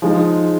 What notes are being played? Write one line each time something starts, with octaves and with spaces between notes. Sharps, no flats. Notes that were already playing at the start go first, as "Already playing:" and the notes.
F3 G#3 D#4